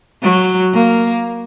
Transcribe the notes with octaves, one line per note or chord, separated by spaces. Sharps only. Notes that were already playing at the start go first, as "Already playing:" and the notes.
F#3
A#3